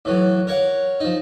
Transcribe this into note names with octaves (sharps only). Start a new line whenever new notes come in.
A2 E3 F#3
A#4 C#5 F5 F#5
F3 D#4